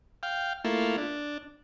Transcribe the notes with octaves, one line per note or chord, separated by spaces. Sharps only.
F5 G5
A3 A#3 E4 F4
D4